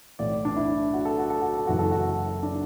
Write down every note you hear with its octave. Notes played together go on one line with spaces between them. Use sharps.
B1 A2 E3 D5
D4
E4
F#4
A4
F#4
A4
F#4
A4
F#1 F#2 E3 F#4
A4
F#4
D4